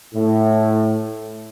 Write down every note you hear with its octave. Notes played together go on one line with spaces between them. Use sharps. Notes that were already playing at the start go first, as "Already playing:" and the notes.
A2